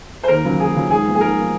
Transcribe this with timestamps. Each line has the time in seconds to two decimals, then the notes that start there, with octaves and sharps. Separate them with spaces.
0.24 C5
0.28 D#2 A#4
0.44 C#3 F#3 C#4 F4
0.59 D#2 G#4
0.75 C#3 F#3 C#4 F4
0.90 G#2 G#4
1.06 F3 A#3
1.15 G#4
1.21 G#2 A#4
1.37 F3 A#3